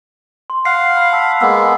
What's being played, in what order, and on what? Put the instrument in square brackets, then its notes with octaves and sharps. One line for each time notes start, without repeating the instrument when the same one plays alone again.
[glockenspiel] C6
[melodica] F5 F#5 [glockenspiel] C7
[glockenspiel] B5 C7
A5 E6 B6
[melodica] G#3 A#3 B3 [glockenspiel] E6